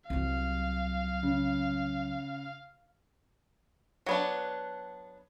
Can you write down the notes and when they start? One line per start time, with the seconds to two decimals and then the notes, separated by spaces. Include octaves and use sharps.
0.10 C2 F#3 F5
1.23 C#3
4.06 F#3 B3 D4